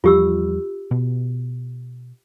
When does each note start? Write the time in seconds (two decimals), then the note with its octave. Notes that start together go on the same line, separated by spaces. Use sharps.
0.04 E2 F3 G3 F4 G4 E6
0.91 B2